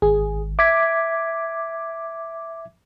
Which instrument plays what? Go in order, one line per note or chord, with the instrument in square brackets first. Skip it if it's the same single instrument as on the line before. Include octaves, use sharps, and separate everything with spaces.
[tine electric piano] G#1 [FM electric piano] G#4
[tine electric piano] E5 G#6 B6 [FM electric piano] D6